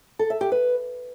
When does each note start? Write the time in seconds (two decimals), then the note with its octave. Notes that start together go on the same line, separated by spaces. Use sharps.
0.19 A4
0.30 E5
0.41 G4
0.52 B4